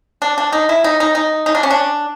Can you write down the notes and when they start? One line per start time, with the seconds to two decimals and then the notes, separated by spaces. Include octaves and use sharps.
0.22 D4
0.38 D4
0.52 D#4
0.69 E4
0.84 D#4
1.00 D#4
1.15 D#4
1.46 D#4
1.55 D4
1.63 C#4
1.71 D4